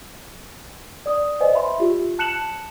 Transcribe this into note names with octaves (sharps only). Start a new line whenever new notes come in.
D5 D#6
B4 C5 D5 D#5 G#5
E5 B5 C6
F4 G4
A5 F#6 C#7 E7 F#7